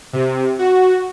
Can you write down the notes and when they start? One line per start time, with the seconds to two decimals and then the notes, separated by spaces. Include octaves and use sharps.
0.13 C3
0.59 F#4